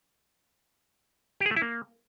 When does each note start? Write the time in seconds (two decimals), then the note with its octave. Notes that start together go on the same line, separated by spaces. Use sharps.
1.40 G4
1.46 G#4
1.51 A3
1.56 E4
1.62 A#3